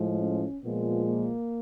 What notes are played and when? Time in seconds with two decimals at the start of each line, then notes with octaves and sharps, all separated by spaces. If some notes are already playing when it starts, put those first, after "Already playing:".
Already playing: A2 F3 G#3
0.19 C#4
0.63 A#2 F3 G#3 B3
1.06 A#3